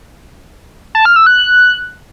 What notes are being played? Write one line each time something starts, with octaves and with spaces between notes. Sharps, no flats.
A5
F6
E6
F#6